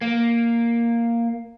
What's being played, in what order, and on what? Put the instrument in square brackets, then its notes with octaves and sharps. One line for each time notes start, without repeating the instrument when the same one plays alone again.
[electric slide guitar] A#3